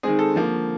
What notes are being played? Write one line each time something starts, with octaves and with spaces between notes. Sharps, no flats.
D#3 G#3 C4 G#4
A4
D3 F3 A#3